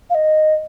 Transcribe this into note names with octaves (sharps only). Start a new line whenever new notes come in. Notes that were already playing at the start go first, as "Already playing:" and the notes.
F5
D#5